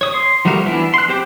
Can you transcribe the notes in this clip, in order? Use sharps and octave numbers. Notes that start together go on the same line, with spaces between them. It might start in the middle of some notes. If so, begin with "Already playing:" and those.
C#5 D#6
C6
F3 G3 A3 F#4 A#4
E3 B3 D4 E4
C6 F#6
C4 G4 C5 G5 D6